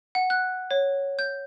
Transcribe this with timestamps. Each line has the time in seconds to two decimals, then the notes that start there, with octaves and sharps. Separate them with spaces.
0.15 F#5
0.30 F#6
0.71 C#5
1.19 G6